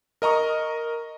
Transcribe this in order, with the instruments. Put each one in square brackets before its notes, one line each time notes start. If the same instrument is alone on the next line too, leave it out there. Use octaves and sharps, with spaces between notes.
[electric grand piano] A#4 D#5 A#5 C#6 D#6